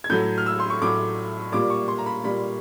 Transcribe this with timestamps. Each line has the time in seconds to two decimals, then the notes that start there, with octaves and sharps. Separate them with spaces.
0.04 G#6
0.09 A2 F#3 A3 G6
0.38 F6
0.46 E6
0.60 C6
0.70 C#6
0.82 A2 F#3 A3 D6
1.52 A#2 G3 A#3 D6
1.70 C#6
1.88 C6
1.98 A#5
2.06 B5
2.24 A#2 G3 A#3 B5